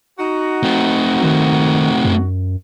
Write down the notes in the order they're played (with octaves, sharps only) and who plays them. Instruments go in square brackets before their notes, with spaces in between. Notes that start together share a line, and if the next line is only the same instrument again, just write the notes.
[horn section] D#4 F#4
[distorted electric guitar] A3 C4
[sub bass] D#3
F#2